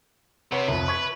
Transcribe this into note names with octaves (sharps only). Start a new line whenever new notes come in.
C3 B4 C#5 F#5
C2 F2 B4
C#6 G#6 B6